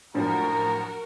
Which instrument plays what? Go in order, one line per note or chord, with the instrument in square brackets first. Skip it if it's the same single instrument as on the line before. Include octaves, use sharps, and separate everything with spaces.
[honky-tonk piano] F#2 A2 F3 [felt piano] D4 [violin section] F#4 A#4 [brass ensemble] A#5